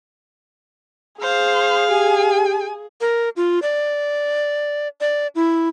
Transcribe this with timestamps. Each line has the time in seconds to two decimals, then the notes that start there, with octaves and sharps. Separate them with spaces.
1.22 G#4 C5 F5
1.90 G4 G#5
3.01 A#4
3.36 F4
3.62 D5
5.01 D5
5.35 E4